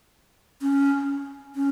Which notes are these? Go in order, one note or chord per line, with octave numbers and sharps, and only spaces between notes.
C#4
C#4